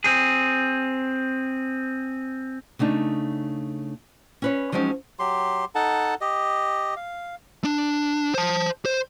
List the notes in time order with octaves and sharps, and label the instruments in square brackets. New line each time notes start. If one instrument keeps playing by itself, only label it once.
[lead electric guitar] C4 G#4
[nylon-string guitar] C#3 A3 D4 D#4
C#4 B4 C#5
F3 F#3 G#3 C4 C#4 D#4
[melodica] F#3 G4 C6
D#4 A4 F#5 A5
G4 D#5
F5
[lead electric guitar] D4
C5 A5
C5